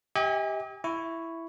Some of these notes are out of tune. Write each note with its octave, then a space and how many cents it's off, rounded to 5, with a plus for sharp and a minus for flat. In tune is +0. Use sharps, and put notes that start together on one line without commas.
G4 +0 D#5 +45 G#5 -35
E4 +5 C#6 +0